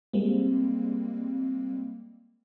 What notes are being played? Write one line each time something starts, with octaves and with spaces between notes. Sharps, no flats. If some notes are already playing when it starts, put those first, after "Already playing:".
G3 G#3 A#3 C4